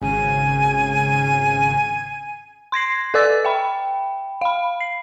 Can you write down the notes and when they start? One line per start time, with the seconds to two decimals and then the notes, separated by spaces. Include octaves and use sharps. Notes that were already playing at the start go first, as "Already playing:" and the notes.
0.02 G#1 C#3 G#5
2.72 C6 G#6 A#6 C7
3.14 A4 B4 D5 D6 E6 A6
3.45 E5 G5 B5
4.41 F5 B5
4.80 C7